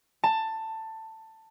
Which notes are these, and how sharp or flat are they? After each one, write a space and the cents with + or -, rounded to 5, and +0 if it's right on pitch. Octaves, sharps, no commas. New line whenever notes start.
A5 +15